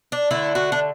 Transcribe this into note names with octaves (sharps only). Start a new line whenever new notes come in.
D4
D3 A3 E4
F#4
D4